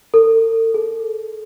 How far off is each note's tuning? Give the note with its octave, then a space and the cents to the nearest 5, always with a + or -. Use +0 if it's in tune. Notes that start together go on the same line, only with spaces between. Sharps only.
A4 +45
A4 -40